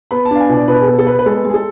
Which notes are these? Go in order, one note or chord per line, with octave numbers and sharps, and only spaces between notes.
B3 B5
A5
D4 F5
G#5
B2 D5
B2 B4
G#4
B3 A4
A4
B3 B4
B4
G#3 A4
G#3 G#4
A4